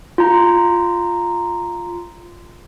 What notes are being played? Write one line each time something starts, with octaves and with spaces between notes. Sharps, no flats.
F4 A#5